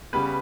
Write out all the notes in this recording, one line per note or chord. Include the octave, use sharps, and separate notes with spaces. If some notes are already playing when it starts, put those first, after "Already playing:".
C#3 G3 B3 B4